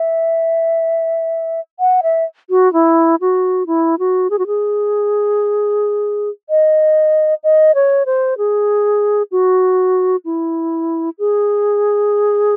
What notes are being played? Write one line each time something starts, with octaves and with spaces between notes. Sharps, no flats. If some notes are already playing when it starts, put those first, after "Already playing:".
Already playing: E5
F#5
E5
F#4
E4
F#4
E4
F#4
G#4
F#4
G#4
D#5
D#5
C#5
C5
G#4
F#4
E4
G#4